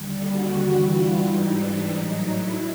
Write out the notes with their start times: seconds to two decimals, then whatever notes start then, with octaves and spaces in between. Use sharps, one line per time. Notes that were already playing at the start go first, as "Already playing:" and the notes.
Already playing: D#2 D3 G3
0.24 F#4
0.56 G2 E3 G3
0.90 F4
1.23 G#2 E3 G3 D#4
1.57 D4
1.90 A2 F#3 D#4
2.23 E4